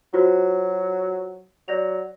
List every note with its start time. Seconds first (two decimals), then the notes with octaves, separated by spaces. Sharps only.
0.14 F#3 F4 F#4 C5
1.68 F#3 D5 A#6 F7